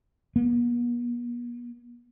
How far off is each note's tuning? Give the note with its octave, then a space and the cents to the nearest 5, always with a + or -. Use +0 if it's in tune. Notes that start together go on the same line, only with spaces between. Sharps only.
B3 -45